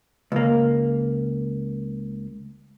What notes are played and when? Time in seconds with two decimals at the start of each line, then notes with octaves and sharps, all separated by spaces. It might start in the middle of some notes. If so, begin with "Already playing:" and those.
0.32 C#2 A#3